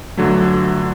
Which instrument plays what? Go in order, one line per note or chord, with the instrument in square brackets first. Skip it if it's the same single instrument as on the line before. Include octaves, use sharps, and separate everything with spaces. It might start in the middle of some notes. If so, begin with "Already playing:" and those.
[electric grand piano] G1 D3 F#3 A3